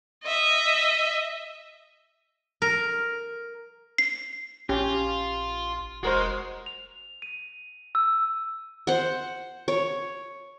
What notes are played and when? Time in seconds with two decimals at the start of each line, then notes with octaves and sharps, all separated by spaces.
0.24 D#5 E5
2.62 A#4
3.98 C7
4.69 A#1 C#4 F4 G4
6.03 F1 G#3 F#4 A#4 C5
6.66 F7
7.22 D#7
7.95 E6
8.87 C5 F#5
9.68 C#5